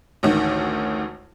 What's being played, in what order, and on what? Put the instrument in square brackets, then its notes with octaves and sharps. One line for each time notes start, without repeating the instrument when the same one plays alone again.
[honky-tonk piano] A1 D2 D#3